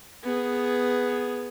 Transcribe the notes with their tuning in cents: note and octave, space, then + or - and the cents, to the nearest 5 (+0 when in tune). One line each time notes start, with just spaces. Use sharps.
B3 +0 G#4 +0